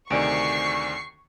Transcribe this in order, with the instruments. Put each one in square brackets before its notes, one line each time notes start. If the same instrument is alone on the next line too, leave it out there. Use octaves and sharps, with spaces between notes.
[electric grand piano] D2 C3 D#3 [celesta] D5 G#5 D7 [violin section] C#6 C7